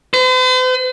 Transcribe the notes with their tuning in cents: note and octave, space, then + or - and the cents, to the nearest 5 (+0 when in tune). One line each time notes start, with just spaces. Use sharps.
C5 -45